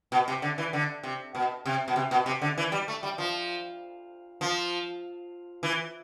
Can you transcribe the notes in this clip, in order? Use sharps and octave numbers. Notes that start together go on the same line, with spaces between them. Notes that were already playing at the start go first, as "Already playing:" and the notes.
B2
C3
D3
E3
D3
C3
B2
C3
B2
C3
B2
C3
D3
E3
G3
A3
G3
F3
F3
E3